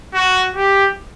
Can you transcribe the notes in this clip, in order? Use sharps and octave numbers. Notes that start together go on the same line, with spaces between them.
F#4
G4